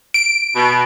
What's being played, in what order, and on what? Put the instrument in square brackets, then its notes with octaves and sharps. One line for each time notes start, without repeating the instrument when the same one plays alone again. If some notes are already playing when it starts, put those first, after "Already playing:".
[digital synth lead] D7
[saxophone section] B2